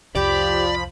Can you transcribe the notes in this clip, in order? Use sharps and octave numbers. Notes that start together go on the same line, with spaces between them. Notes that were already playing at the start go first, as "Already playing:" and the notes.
C2 F2 F3 G4 D5 B5